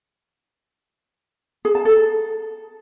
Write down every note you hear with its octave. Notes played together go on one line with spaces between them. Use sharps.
G#4
A5
A4